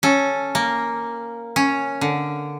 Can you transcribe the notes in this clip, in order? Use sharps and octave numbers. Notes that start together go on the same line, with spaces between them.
C#4 A4
A#3
C#4
D3